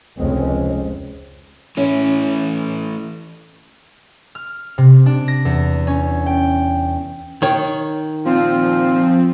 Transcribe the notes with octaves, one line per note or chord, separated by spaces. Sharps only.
F1 C#2 G#3 C4 C#4
E3 A3 C#4 E4
F6
C3
D4
A#6
E2
C#4
G5
D#3 C#5
A#2 F3 C4 F4